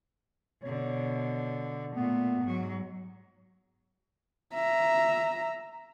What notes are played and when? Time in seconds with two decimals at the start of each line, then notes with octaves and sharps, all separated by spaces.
0.63 B2 D3 C#5
1.96 A#2 A3 B3
2.43 G#2 F#3
4.54 E5 A#5